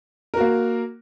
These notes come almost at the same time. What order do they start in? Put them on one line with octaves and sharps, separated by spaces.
A#4 F#4 A#3